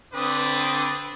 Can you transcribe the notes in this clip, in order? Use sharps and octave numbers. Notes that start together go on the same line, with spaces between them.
D3 C4 B4 D5 D#6